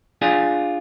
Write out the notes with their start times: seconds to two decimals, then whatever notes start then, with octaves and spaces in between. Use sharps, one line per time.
0.22 D4 F4 G#4